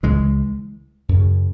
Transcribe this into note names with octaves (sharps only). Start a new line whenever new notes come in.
C#2 C#3 E3 G#3
F#2
C#3